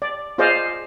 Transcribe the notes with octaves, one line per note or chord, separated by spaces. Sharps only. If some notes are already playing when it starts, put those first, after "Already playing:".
D5
F4 G#4 C5 D5 D#5 F5